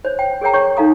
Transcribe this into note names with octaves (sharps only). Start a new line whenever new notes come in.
C5 C#5
G5
G#4 A#4 C#5 G5 A#5
C#5 C#6
D#4 A4 F5 A#5 D#6